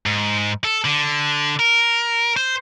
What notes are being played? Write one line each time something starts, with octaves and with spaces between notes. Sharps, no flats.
G#2
A4
D3
A#4
C5